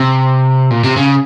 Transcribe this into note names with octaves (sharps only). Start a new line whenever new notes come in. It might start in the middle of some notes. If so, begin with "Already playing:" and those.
Already playing: C3
A#2
C3
C#3